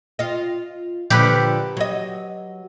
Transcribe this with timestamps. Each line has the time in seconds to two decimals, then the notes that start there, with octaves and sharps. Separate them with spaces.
0.19 F4 D#5
1.10 A#2 D3 F3 G4 B4
1.77 F#3 D#5